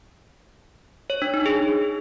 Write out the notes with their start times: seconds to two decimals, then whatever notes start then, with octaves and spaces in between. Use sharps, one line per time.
1.10 C#5
1.22 D4
1.34 D#4
1.46 G#4